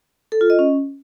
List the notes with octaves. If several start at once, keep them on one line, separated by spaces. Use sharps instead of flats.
A4
F4
D#5
C#4